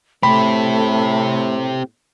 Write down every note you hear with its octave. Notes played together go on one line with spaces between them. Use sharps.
A2 A3 C4 G4 B5